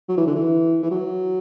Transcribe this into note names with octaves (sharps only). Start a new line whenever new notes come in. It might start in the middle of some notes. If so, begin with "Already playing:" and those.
F#3
E3
D3
E3
E3
F#3